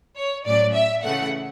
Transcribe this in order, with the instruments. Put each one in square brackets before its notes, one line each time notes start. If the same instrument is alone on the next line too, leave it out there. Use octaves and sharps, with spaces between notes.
[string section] C#5
A2 F#3 C#4 D5
E5
C#3 E3 A3 F#5